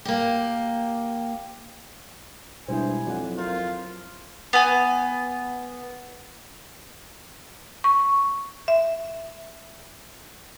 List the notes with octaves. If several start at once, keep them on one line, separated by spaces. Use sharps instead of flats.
A#3 G4
G2 B2 G#3 E4 C5 G#5
F2 F#3 D5 F#5
C4 F4 A#4
B3 G#5
C#6
E5